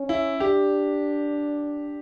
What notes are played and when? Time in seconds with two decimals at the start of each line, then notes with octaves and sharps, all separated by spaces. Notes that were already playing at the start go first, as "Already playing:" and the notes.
Already playing: C#4
0.09 E4
0.40 D4 G4